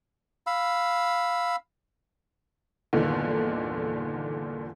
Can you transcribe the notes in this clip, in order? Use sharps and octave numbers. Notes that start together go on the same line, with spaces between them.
F5 B5 E6
G1 E2 A#2 D3 D#3